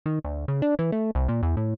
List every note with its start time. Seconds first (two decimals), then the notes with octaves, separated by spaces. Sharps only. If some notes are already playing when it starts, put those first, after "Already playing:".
0.06 D#3
0.24 D2
0.48 C#3
0.62 D4
0.79 E3
0.92 A3
1.15 C2
1.28 A#2
1.43 E2
1.57 A2